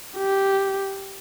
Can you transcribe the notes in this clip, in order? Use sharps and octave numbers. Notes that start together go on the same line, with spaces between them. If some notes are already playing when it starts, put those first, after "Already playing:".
G4